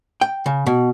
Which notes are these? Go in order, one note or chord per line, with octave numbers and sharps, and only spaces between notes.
G5
C#3
B2